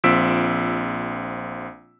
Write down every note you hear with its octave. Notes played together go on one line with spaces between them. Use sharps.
A#1 C4 F4 E6 B6 D7